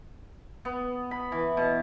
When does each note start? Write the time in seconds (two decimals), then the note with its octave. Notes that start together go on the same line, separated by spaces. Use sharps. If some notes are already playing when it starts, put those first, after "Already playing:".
0.65 B3
1.11 B5
1.32 E3
1.57 B2